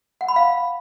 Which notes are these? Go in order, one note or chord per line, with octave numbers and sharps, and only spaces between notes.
F#5
B5
F5